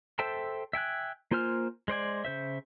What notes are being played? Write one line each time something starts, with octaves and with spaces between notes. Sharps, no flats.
A4 C5 E5 G5 A5
E5 G5 G#5 F#6
A#3 F4 C5 G#5 F6
G#3 C5 D5 G#5
C#3 C5 E5